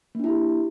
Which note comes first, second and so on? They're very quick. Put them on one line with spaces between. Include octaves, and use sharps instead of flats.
A#3 D4 E4 G4